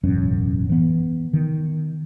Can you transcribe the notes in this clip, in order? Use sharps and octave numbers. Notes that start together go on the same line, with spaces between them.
E1 A1 F#2 C#4
E3 B3
D#3